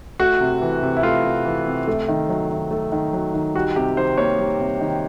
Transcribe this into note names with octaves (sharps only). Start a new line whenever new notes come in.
A3 F#4
C3
E3
C3
E4
A3 F4
C3
E3
C3
A3
D#3
F#3
D#3
A3
D#3
F#3
D#3
G3 F#4
C3 G4
D#3 C5
A#3 C#5
G3
C3
D#3